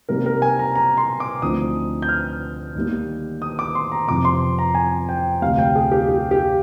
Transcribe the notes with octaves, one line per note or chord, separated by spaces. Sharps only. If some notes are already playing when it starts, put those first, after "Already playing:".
C3 G3 A#3 D#4 A#4
A#4
G#5
A#5
A#5
C6
D6
D2 D3 F3 C4 D#4 D#6
G6
F6
D#2 D#3 G3 A#3
D#6
D6
C6
A#5
F2 C3 F3 D6
C6
A#5
G#5
G5
D2 C3 G3 F5
G5
G#4
G4
G4
G4